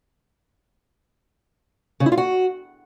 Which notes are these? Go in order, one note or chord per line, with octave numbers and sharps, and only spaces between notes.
C#3
E4
F4
F#4